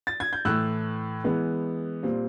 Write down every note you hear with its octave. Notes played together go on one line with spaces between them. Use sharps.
A6
G#6
G6
A2 E3 A3 E6 F#6
E3 G#3 B3
A#2 G3 C4